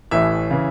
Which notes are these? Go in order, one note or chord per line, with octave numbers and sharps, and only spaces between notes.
A1 A2 E3 E5
C#3 E3